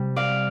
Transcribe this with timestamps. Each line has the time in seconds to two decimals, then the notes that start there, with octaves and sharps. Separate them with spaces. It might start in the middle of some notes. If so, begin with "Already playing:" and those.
Already playing: C3 G3
0.16 D5 F5